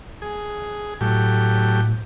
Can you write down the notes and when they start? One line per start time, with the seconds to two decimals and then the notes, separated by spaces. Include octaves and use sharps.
0.22 G#4
1.01 A2 F#3 A3 G4